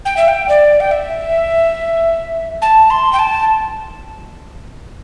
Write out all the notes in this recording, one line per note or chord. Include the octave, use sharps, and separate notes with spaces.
G5
E5
G5
D5
G5
E5
A5
C6
G5
A5